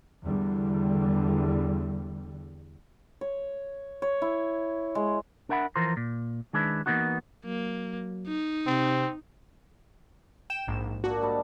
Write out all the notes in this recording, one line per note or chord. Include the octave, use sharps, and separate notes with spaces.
E2 D3 G3
C#5
C#5
E4
G#3
D4 A#4 E5 F#5 B5
E3 F3 A#4 C5
A#2
D#3 G#3 D4 E4 B4
E3 G3 A#3 B3 D#4 F#4
F#3 A#3
D#4
C3 C4
G5 E7
A#1 G#2
A#2 D4 F#4
G#2 G3 A5